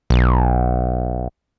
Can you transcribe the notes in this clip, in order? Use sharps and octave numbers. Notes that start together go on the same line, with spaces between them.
B1